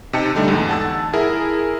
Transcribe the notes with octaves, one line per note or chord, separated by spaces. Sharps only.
C3 D#4 G5 A5 C#7
D3 G3 A3 D4 D#4
E2 G#2
F#5 A5 E6
E4 G#4 A#4